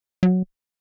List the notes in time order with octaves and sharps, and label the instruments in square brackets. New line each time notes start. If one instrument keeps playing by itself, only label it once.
[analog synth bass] F#3